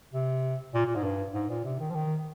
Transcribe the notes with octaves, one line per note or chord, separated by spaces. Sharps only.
C3
A#2
A#2
G#2
G2
G#2
A#2
C3
D#3
F3
D#3